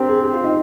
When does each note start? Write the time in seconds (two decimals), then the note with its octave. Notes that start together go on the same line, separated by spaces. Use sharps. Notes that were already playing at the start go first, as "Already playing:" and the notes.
Already playing: C4 D4 G4 A#4
0.08 G#4
0.23 G4
0.34 F4
0.44 D#4